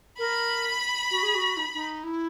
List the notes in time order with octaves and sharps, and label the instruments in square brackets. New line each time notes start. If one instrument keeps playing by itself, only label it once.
[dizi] A#4 [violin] B5
[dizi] F#4
G#4
F#4
D#4
D#4
E4